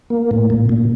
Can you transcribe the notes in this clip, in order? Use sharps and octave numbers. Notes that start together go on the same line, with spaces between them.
A#3
A2
A#2
A#2